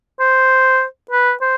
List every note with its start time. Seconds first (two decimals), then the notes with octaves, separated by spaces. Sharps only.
0.20 C5
1.11 B4
1.42 C5